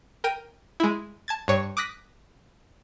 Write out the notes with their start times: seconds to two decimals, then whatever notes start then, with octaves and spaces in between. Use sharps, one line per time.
0.24 A#4 G5 D#7
0.80 G#3 E4
1.28 A5 G#6 A6
1.48 G2 C#5 C#6
1.77 D6 D#6 F#6 A#6 B6